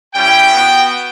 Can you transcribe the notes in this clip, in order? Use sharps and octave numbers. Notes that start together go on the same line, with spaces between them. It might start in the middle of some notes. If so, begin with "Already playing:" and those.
G3 C#4 E4 G5
B3 F#4